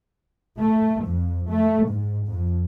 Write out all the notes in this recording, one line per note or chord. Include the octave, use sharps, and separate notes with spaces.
A3
F2
A3
G#2
F2